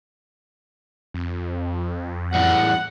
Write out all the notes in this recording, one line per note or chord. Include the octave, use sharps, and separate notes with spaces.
F2
E2 A2 F#5